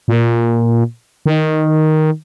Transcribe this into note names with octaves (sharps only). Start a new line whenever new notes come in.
A#2
D#3